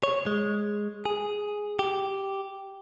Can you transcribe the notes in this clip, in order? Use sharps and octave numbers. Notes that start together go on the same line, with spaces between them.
C#5
G#3
G#4
G4